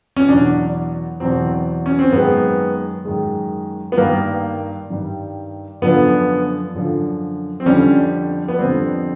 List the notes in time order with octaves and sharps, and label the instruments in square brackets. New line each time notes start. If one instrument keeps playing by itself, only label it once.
[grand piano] C#4
E2 B2 F#3 D4
E2 B2 F#3 C4
C#4
C4
F#2 D#3 G#3 B3
F#2 D#3 G#3
B3
G2 D#3 G3 A#3
G2 D#3 G3
F#2 D3 F3 B3
F#2 D3 F3
C4
F2 D3 G3 C#4
B3
F2 D3 G3 C4